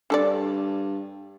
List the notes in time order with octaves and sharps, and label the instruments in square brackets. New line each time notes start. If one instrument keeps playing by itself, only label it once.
[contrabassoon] G2 [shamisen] D3 A4 D5